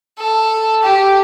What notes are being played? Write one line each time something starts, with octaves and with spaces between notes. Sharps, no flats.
A4
G4